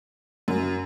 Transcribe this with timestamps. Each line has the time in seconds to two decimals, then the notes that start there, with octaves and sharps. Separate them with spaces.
0.48 F#2